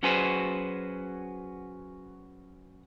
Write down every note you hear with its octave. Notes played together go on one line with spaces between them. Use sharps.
F#3 C#4 F#4 G#4 B4 C5